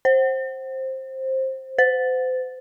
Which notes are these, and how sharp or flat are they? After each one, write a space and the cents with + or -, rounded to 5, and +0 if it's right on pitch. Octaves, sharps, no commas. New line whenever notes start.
C5 +15
C5 -35